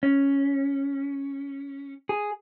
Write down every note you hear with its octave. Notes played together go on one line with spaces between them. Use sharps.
C#4
G#4